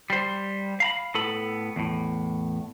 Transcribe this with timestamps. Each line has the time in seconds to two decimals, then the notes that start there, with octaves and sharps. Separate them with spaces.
0.10 G3 C5
0.80 F5 A#5 B5
1.15 A2 B3 A4 B5
1.76 E2 A2